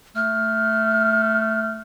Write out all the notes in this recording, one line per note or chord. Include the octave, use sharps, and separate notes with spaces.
A3 F6